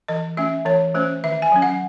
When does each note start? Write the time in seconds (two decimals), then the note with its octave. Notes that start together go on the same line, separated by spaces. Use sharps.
0.08 E3 D#5
0.37 A3 C#4 E5
0.65 E3 C#5
0.95 A3 C#4 C5
1.24 D#3 E5
1.42 G#5
1.52 F#3 C#4
1.62 F#5